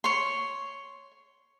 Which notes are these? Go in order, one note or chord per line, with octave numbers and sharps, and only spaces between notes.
C#5 C6